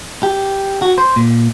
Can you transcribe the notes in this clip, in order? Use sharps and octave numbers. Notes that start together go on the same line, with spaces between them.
G4
F#4
C5
A#2